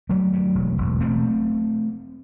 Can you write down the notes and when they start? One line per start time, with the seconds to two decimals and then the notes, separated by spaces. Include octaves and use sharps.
0.09 G2 F#3 A3
0.33 G2
0.55 E1
0.78 E1
1.01 E1 A3 C4